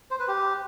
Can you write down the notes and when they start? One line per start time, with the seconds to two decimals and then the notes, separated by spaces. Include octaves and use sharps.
0.11 C5
0.19 B4
0.28 G4